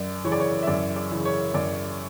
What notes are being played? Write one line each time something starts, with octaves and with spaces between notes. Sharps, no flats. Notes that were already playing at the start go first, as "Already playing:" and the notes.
Already playing: F#2 D5
C#3 E3 C#5
D5
C#5
E5
F#2 D5
D5
C#3 E3
C#5
F#2 D5